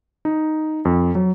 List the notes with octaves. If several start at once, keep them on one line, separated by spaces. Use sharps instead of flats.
D#4
F2
F#3